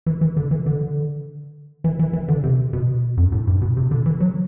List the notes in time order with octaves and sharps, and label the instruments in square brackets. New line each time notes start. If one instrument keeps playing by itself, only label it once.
[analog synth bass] E3
E3
D3
E3
D3
E3
E3
E3
D3
C3
B2
F#2
A2
G2
B2
C3
D3
E3
F#3